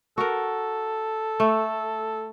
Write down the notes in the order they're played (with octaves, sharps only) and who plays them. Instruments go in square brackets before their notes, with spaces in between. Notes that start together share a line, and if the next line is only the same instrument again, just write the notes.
[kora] F#4 A#4 [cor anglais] A4
[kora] A3